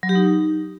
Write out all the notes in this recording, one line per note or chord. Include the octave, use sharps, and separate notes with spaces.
F#3
G4
D#4